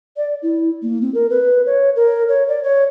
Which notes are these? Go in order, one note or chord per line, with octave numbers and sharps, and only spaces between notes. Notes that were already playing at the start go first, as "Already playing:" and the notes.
D5
E4
A#3
C4
A#4
B4
C#5
A#4
C#5
D5
C#5